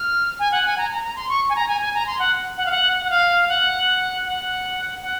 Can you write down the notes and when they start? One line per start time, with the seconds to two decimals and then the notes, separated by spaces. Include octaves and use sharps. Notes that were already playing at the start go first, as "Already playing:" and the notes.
Already playing: F6
0.39 G#5
0.52 F#5
0.66 G#5
0.78 A#5
0.91 A#5
1.04 A#5
1.16 C6
1.29 C#6
1.50 G#5
1.56 A#5
1.68 G#5
1.81 G#5
1.94 A#5
2.07 C6
2.19 F#5
2.57 F#5
2.66 F5
2.71 F#5
3.05 F#5
3.10 F5
3.49 F#5
4.25 F#5
5.02 F#5